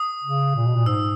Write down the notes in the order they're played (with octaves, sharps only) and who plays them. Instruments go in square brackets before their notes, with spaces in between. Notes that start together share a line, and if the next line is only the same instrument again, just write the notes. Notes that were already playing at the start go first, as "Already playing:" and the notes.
Already playing: [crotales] D#6
[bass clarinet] C#3
A#2
B2
A#2
[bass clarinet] G#2 [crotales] E6